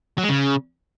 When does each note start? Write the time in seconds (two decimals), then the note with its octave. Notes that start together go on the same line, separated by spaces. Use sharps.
0.18 F#3
0.24 G#3
0.29 C#3